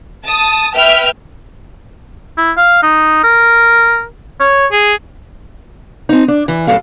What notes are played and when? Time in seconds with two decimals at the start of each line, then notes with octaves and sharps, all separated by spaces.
0.25 A5 D#6
0.75 B4 E5 G5 F6
2.38 E4
2.57 F5
2.83 D#4
3.24 A#4
4.40 C#5
4.72 G#4
6.09 C4 D#4
6.28 D4
6.48 E3
6.67 F#2 A2 C#3 A#3 A4 F5